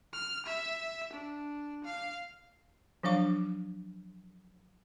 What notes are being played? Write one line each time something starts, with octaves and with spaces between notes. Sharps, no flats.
F6
E5
D4
F5
F3 F#3 D4 F5 D6